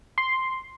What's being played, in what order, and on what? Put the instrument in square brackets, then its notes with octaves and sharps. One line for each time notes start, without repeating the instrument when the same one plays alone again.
[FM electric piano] C6